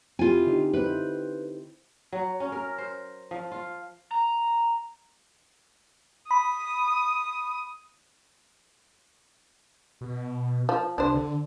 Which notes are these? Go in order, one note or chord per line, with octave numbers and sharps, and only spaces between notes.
C4 E4 F4 G4 G#5
D3 D#4 G4
E4 B4 C5
F#3
C#4
A#4
C5
F3
F4
A#5
B5 D#6
B2
F3
C2 D4 C5
D3